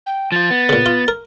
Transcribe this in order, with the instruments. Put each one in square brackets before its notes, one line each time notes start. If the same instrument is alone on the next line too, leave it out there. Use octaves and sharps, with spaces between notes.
[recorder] G5
[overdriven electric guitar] F3 F4 [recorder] A6
[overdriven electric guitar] B3
[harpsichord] A#2 C#3
F4
A#4